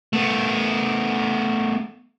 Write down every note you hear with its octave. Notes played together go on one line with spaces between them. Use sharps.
A3 B3